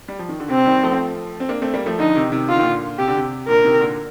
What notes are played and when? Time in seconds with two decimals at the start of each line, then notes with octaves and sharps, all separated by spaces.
0.08 G3
0.19 F3
0.29 D#3
0.40 D3
0.50 C3 C4
0.66 D#3 G3
0.83 F3 A3
1.40 C4
1.49 A#3 D4
1.62 A3 C4
1.74 G3 A#3
1.86 F3 A3
1.99 D3 F3 D#4
2.16 C3 D#3
2.32 C3 D#3
2.48 D3 F4
2.56 D#3
2.63 A#2 D3
2.98 C3 G4
3.08 D3
3.17 C3
3.47 A#2 D3 A#4
3.65 C3 D#3
3.81 A#2 D3